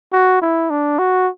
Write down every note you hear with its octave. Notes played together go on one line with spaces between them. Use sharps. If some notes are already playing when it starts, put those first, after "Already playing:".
F#4
E4
D4
F#4